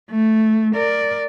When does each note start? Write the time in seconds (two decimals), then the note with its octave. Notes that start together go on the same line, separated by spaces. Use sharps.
0.10 A3
0.76 A#4 D5